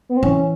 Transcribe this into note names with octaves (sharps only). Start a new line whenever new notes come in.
B3
C4
E3 C#4